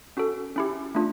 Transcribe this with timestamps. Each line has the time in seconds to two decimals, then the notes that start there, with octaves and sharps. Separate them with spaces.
0.17 C#4 F#4 A4
0.56 C#4 E4 G4
0.95 A3 D4 F4